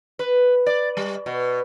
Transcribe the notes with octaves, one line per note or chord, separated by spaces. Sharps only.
B4
D5
G3
B2